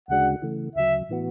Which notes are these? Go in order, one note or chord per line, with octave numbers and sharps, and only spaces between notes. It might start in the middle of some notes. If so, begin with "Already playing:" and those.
D2 C#3 G#3 D4 F#4 F#5
C#3 E3 A3
D2 C#3 F#3 E5
A2 E3 B3 F#4